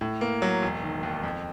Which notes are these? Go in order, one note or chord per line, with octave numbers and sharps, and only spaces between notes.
A2
A#3
F#3
E1
D#3
D#2
F2